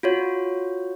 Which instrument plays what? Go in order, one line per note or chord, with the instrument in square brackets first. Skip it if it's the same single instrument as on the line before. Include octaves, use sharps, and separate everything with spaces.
[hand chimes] F4 F#4 C#5